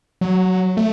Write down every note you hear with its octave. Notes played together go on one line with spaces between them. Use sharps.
F#3
A3